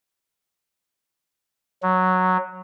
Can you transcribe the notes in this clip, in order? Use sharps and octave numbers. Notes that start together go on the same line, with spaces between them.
F#3